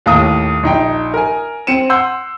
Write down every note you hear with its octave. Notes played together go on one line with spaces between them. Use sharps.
D#2 A2 F5 A#5 D#6
A#1 D#4 G5
A#4 G#5
C4 C#7 D#7 E7
F#5 C6 E6 G6